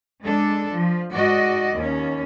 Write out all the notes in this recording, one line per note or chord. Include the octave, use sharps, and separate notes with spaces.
G#3 D4 A4
F3
G#2 F#4 D5 D#5
D#2 C#4